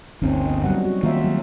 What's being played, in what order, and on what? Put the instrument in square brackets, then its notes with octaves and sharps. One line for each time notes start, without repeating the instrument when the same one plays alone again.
[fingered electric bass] G1 D2 [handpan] C4 C#4 D#4
[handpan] B3 D#5
F#3 G3 F#5
F#4
[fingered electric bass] D#3 A#3 [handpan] F4 E5
[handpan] F#3 G#3